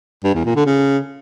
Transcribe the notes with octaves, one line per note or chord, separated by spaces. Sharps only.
G2
E2
A#2
D3
C#3